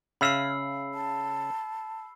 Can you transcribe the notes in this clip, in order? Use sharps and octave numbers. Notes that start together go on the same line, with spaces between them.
C#3 E5 F5 B5 E6 C7
A5